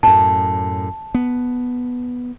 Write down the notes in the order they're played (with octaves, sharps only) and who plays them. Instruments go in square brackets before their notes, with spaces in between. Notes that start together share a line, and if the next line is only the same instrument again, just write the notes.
[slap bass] F#2 A2 [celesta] A5
[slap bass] B3